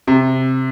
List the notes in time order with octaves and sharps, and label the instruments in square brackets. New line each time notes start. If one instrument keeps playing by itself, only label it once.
[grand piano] C3